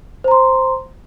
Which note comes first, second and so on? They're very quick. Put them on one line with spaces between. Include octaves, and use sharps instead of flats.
C5 A#5 C6